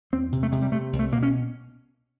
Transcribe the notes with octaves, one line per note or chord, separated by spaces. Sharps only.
E2 C4
C3
A3
C3 G#3
G3
C3 A3
C2
A3
B2 A#3
C#4